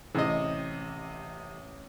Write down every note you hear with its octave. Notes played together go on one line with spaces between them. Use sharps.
A1 C3 D#5